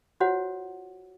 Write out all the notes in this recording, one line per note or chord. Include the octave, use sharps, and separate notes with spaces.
F4 F#4 C5 C#5 F#5